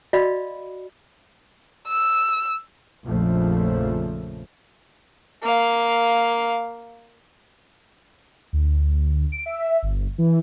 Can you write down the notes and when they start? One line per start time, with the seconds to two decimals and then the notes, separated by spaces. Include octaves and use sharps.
0.13 F#4 D5 D#5 F5 B5
1.88 E6
3.05 A#1 F2 C#3 F3 A3
5.43 A#3 F5
8.53 D2
9.32 D7
9.46 E5
9.82 G1
10.18 E3